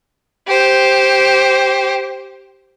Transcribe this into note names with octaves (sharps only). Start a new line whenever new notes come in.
G4 C5